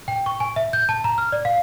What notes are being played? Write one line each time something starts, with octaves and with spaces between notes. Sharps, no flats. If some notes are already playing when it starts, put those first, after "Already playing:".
G5
C#6
G#5
E5
G6
A5
A#5
F6
D5
F5